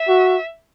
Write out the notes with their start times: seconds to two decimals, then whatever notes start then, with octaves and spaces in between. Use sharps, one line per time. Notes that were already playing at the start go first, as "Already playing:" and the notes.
Already playing: E5
0.08 F#4